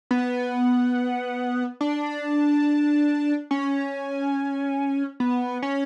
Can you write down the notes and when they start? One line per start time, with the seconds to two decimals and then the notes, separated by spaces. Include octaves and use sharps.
0.11 B3
1.81 D4
3.51 C#4
5.20 B3
5.62 C#4